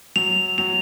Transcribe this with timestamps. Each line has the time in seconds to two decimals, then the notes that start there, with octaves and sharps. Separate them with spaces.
0.16 F#3 F7
0.58 F#3 F7